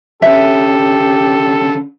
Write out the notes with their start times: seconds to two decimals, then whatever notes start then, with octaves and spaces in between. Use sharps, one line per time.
0.22 D3 C#4 G4 A4 B4 E5